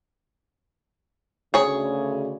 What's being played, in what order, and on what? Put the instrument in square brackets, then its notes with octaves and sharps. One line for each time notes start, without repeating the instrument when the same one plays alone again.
[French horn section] D2 C#3 [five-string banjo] G#4 C#5